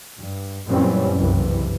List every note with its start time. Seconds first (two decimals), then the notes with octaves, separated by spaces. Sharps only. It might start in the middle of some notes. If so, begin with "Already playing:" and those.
0.18 G2
0.68 F#2 A#2 E3 G3 C4 C#4
1.17 F#1 C2 G2 E3